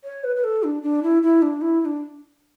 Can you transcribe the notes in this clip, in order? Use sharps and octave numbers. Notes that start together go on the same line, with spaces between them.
C#5
B4
B4
A4
D4
D4
E4
E4
D4
E4
E4
D4